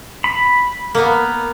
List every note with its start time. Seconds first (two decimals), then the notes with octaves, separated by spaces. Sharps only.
0.24 B5
0.95 A#3 B3